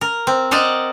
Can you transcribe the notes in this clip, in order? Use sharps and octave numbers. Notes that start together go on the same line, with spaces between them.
A#4
C4
A#4 C5 D5 D#5 F#5